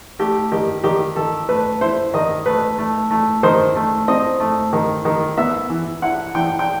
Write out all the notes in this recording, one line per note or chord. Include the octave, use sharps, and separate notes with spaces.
A3 G4
D#3 G4
D#3 G4
D#3 A4
A3 B4
E4 C5
D#3 D#5
A3 B4
A3
A3
D#3 C5
A3
C4 D#5
A3
D#3
D#3
B3 E5
E3
E4 F#5
E3 G5
G5